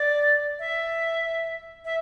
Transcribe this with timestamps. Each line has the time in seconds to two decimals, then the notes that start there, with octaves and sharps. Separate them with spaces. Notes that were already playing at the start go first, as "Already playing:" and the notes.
Already playing: D5
0.59 E5
1.85 E5